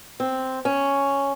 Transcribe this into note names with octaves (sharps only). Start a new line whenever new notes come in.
C4
C#4